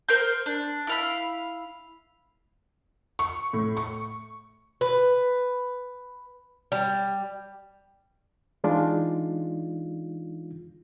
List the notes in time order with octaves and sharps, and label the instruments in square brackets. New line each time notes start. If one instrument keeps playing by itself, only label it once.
[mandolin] A#4 C5 G6
D4
E4 F5 B5
[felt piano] C#6
A2
C#6
[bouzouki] B4
G3
[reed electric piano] E3 G#3 D4 D#4 F4